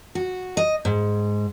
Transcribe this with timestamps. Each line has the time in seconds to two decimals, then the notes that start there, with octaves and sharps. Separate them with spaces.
0.15 F#4
0.57 D#5
0.85 G#2